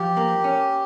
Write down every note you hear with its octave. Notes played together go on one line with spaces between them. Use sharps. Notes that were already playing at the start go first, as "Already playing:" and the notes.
Already playing: F3 G4
A#3
C#4